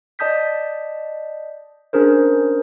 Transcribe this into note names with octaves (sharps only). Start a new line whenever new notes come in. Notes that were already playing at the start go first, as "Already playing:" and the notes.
D5 D#5 A5 D#6 G6 B6
C#4 D4 G#4 A#4 C5